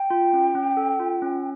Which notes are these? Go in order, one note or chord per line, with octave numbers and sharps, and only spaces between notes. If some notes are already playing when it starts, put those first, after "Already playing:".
Already playing: G5
F4
C#4
C#4
A4
F4
C#4